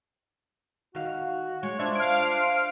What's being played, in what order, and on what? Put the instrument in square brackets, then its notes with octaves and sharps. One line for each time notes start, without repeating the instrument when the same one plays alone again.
[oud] D#3 F5 [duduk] F#4
[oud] G#3 [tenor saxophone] C#5
[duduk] D4 [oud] F4 D5 E5 [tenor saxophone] C5 [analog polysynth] G#6
[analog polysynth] F5 D7